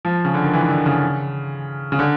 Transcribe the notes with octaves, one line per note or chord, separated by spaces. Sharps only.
F3
C#3
D3
D#3
E3
D#3
D3
C#3
C#3
D3